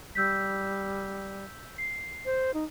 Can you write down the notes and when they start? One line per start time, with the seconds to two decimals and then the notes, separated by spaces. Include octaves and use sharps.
0.15 G3 E6 G6 B6
1.78 C7
2.26 C5
2.54 D#4